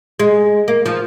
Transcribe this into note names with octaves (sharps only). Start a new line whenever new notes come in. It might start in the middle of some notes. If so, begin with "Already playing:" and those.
G#3
A#3
F3